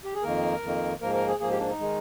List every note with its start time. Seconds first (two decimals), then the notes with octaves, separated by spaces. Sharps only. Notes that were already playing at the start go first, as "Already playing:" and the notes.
0.05 G4
0.14 G#4
0.23 F2 D#3 A#3 A#4
0.62 F2 D#3 A#3
1.01 G#2 F3 A#3 A#4
1.15 A#4
1.27 G#4
1.40 G#2 F3 A#3 G#4
1.50 G4
1.60 D4
1.69 D#4
1.79 D#3 G#3